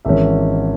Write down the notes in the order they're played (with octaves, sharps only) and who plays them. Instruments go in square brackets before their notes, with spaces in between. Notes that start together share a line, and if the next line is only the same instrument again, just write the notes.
[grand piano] G#1 G#2 E3 C#4 E5